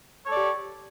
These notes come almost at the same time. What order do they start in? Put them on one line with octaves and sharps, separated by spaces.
C#5 A4 D5 G4